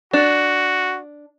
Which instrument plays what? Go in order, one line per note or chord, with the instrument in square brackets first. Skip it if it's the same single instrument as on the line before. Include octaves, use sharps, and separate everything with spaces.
[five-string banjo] D4 [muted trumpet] F#4